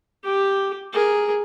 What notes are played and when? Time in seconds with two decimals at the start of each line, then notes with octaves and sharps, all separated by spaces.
0.24 G4
0.93 G#4 A#4